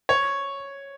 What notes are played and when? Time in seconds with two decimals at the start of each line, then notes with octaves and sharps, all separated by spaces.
0.09 C#5